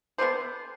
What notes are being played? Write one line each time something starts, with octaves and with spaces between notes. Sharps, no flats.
D3 G3 B3 C5